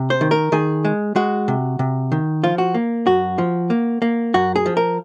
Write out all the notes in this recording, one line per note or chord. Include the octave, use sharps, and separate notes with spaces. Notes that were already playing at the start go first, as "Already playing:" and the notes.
Already playing: C3
C5
D#3
A#4
D#3 G#4
G#3
G#3 F#4
C3
C3
D#3
F3 F4
F#4
A#3
F#2 F#4
F3
A#3
A#3
F#2 F#4
G#4
F3
A#4